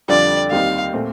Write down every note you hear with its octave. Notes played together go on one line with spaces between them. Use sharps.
F2 D3 G3 D4 F4 D5
D#2 D#3 G3 C4 D#4 F5
A#2 A3 C4